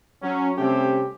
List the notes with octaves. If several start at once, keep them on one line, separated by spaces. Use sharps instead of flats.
F#3 C#4
C3 G3 A3 C4 C#4 G4